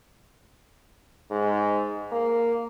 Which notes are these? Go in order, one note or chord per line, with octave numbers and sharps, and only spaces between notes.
G#2
A#3